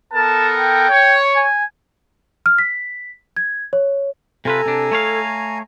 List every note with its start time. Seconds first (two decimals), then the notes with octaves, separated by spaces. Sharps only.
0.13 B3 A4 A#4 A5
0.58 G5
0.90 C#5
1.36 G#5
2.46 F6
2.58 B6
3.37 G#6
3.73 C#5
4.45 C3 F4 A4 B4 G#5 A#5
4.66 C3 D4
4.91 A3 C#5 F5